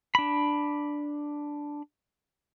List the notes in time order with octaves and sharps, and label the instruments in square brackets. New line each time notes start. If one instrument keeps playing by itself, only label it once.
[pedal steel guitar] D4 B5